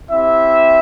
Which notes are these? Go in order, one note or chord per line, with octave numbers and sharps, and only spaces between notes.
C4 E4 G4 E5